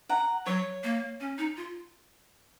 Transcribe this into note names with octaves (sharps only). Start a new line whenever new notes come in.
F#5 A#5
F#3 C#5
A#3
C#4
D#4
F4